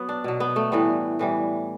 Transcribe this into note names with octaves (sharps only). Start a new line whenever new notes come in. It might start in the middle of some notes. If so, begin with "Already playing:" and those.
Already playing: F#3 B3
D4
B2 F#3
B3
A3
A2 E3 G3 B3
A2 E3 G3